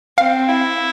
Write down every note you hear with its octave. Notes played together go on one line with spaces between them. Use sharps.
C4 F5
E4